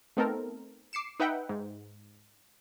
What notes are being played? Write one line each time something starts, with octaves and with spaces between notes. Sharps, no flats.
A3 B3 C4 D#4 A4 A#4
D6 C7 C#7 E7
D#4 B4 E5 F#5 G5
G#2